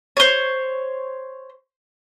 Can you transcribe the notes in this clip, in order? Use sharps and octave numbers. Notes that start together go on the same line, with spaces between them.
C5 C#5